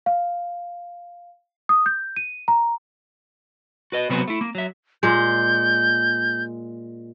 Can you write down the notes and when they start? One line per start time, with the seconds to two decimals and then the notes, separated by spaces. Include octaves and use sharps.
0.06 F5
1.69 D#6
1.86 G6
2.16 D#7
2.48 A#5
3.92 F#4 B4 D#5
4.09 C3 F#3 B3 C4 F#4 B4
4.28 A3 E4
4.41 A#3
4.55 F#3 E5
5.03 A#2 G#3 G6